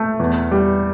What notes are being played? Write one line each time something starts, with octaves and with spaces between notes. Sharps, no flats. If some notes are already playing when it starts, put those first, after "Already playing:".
Already playing: A3
E2
G3